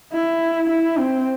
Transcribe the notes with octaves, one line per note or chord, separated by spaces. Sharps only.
E4
E4
C4